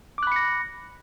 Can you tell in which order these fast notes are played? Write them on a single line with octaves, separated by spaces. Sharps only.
D6 F#6 B5 C#7 A#6